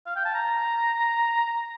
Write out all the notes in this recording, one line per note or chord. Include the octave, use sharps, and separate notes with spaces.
F5
G5
A5
A#5